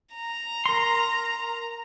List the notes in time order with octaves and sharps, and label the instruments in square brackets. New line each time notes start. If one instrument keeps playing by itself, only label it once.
[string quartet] A#5
[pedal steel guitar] A#4 C6